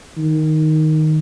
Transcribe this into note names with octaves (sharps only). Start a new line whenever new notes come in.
D#3